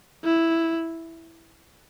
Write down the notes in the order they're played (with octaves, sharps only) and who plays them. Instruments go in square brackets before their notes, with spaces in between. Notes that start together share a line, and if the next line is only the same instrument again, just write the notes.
[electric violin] E4